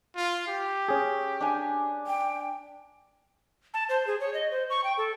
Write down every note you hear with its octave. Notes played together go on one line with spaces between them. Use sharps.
F4
G4
C#4 G#4
D4 G#5
G5
A5
C5
G#4
C#5
D#5
C5
C#6
G5
A4